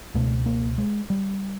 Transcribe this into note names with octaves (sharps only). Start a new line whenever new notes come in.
C#2 B2 A3
A#3
G#3
G3